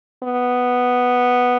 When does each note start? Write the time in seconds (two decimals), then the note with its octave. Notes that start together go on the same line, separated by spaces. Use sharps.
0.23 B3